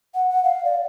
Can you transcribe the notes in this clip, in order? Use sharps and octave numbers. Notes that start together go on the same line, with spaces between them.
F#5
F#5
F5
D5